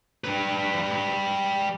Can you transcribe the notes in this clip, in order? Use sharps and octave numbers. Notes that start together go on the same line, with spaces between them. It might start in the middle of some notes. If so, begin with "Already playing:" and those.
G3 B4